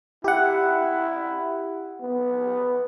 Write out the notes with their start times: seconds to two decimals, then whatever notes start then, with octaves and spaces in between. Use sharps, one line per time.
0.24 E4 G4 F#5
2.01 B3